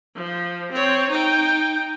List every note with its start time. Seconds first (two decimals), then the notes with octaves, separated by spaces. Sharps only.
0.16 F3
0.72 C4 C#5
1.10 D#4 G5